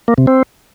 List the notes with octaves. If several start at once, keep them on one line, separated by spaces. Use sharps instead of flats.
A#3
C3
C4